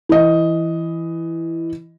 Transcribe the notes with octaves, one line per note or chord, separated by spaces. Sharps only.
E3 D#5